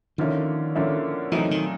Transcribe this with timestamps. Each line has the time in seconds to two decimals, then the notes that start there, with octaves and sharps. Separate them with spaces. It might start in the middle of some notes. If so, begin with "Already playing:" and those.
0.18 D3 D#3 F3 A#3 C#4 E4
0.75 D3 F3 A#3 C#4 E4
1.32 A#2 E3 F#3 A3 C4 D#4
1.51 D#3